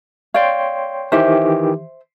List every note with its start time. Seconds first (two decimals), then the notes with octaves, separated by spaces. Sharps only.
0.34 C#5 D5 F5 G5 C6
1.12 D#3 E3 G4 C5 E5